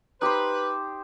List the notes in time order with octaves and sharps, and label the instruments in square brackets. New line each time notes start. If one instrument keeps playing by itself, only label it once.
[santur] D#4 G4 C5 [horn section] B4